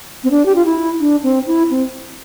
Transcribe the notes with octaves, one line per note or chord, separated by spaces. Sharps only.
C4
D4
G4
F4
E4
D4
C4
E4
C4